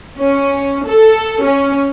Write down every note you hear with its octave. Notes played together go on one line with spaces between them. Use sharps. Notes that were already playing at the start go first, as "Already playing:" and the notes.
C#4
A4
C#4